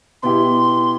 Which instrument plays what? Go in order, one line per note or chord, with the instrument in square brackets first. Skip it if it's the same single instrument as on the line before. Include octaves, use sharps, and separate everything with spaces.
[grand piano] B2 B3 E4 G4 [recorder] C6